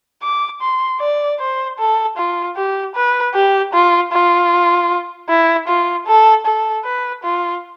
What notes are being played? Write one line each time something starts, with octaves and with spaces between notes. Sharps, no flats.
D6
C6
D5
C5
A4
F4
G4
B4
G4
F4
F4
E4
F4
A4
A4
B4
F4